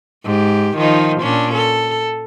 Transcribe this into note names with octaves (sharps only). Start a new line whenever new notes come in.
G#2 G4
D#3 F3 D#4
A#2 C#4 D4
A4